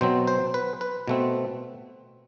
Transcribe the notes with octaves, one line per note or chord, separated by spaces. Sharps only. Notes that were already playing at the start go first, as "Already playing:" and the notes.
B2 F#3 C4 C5
C5
B4
B4
B2 A3 C4